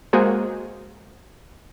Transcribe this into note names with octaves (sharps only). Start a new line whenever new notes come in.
G#3 A#3 F#4 G#4 C5